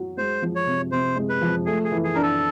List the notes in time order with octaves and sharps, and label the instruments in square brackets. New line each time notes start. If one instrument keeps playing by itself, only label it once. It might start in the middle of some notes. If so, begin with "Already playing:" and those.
Already playing: [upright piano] F#3
[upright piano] G#3 [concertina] C5
[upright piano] F3
[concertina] C#5
[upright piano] C3
[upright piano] C3 [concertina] C5
[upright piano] G#3
[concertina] B4
[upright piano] F3
[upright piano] A3 [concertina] G#4
[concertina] G#4
[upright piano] E3
[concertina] G#4
[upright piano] D4 [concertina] A#4
[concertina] A4